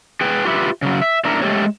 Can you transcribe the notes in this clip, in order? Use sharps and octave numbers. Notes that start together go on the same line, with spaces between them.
G#4 B4 G5
F4 G4 B4 E5
C#3 F#3
E5
E2 A2 D4 A#4 E5 A#5
G#3 A3 G4 C#5